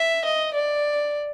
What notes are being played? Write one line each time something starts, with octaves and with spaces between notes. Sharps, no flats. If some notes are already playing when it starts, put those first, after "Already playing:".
Already playing: E5
D#5
D5